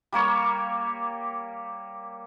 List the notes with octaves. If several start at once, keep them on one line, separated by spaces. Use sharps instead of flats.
G3 A#3 C#5